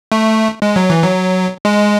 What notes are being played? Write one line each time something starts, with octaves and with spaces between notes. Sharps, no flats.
A3
G#3
F#3
E3
F#3
G#3